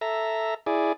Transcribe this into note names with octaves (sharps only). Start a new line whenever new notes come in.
A4 E5 A#5
E4 G#4 D5